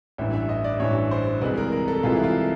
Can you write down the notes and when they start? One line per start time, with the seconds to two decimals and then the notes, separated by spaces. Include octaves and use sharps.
0.18 A1 G2 E3 E5
0.33 E5
0.49 D#5
0.64 D5
0.80 A1 G2 E3 C#5
1.11 C5
1.41 C2 C3 E3 G#3 B4
1.57 A#4
1.72 A#4
1.88 A4
2.03 C2 C3 E3 G#3 F4
2.16 E4
2.24 F4